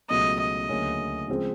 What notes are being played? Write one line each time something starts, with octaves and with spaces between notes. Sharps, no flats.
C#2 B2 F#3 A3 D#5
D#5
D2 C#3 F#3 A#3 C#4
C#3 F3 G#3 C4